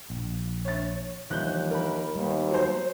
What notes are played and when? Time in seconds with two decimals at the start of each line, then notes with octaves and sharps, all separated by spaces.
0.10 A#1
0.65 C#5 A6
1.31 D#2 E3 F3 G3 F#6 G6
1.71 A#4 B5
2.15 D#2 G3 B3
2.51 F#3 C5